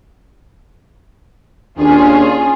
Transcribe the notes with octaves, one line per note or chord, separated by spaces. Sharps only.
D#2 C#4 D4 F4 G#4